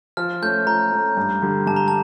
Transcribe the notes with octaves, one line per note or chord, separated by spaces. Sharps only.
F3 F6
A3 C#4 G6
F3 A#5
A3 C#4
G2
D3 G3
G2 A5
A#5
A5